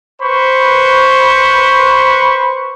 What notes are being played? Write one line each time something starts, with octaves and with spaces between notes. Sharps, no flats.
B4 C5 B5 C#6